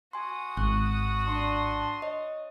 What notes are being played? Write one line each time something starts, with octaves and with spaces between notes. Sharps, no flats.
F#4 G#5 C6 D#6
G#1 C#6 F#6
D4 A5 C6
C#5 D#5